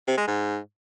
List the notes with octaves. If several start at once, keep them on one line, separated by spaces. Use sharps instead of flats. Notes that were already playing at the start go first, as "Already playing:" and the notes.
C3
G#3
G#2